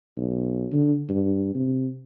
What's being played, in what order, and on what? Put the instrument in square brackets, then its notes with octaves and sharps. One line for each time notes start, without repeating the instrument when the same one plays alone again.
[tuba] B1
D3
G2
C3